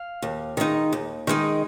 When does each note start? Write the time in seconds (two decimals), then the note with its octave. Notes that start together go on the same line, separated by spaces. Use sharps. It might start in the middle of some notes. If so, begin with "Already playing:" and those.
Already playing: F5
0.22 D#2
0.57 D#3 G#3 D#4
0.93 D#2
1.27 D#3 G#3 D#4